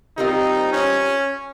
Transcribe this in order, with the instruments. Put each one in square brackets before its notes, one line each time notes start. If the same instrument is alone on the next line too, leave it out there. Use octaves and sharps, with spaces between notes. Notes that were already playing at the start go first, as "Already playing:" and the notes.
[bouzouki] G3 C4 F4 A#4 [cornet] D#4
[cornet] C#4